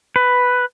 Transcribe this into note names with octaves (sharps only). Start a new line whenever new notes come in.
B4